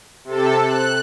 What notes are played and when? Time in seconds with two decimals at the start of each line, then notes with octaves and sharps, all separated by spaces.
0.24 C3 A4
0.64 F#6